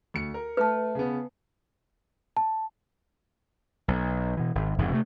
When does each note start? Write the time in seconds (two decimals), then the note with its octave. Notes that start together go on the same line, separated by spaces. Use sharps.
0.14 D2 C#7
0.34 A#4
0.57 A3 B4 A5
0.95 C#3 B3
2.37 A5
3.88 B1
4.37 B2 E3
4.55 G#1
4.78 F1 F2 G#2 C#3
4.92 C3 A3